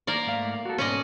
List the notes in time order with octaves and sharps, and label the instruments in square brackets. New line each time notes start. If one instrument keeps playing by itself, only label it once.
[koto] A#3 A#4 D5
[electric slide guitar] G#2 A3 F5
F#4 A4
[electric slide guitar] G#2 B2 [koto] C#4 D5 D#5